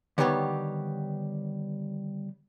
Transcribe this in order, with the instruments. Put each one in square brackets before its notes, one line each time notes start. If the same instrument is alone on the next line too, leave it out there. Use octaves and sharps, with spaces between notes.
[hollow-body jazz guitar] D3 D#3 G3 B3 G4 C#5